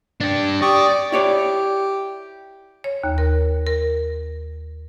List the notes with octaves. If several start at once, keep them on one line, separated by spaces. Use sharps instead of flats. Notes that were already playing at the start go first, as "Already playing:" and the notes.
D4 G4
G4 D5 C#6 D#6
E4 G4 C#5 D5
C#5
D#2
A#4
A#4